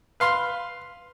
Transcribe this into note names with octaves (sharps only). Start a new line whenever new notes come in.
B4 F5 C6